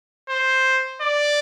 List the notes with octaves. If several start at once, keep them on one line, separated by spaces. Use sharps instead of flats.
C5
D5